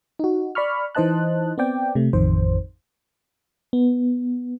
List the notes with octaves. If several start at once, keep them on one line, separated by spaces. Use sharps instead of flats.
D#4 F#4
D5 B5 C#6 F6
E3 D#4 C5 D#5 A5 F#6
B3 C4 D5 G5
C3 A3
A1 F2 D#3 C5
B3